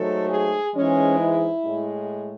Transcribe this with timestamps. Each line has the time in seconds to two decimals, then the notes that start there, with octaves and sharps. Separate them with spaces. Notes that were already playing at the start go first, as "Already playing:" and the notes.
Already playing: G#2 F#3 A3 A4
0.29 G#4
0.74 G#2 E3 G#3 C#4
1.19 E4
1.64 A2 G#3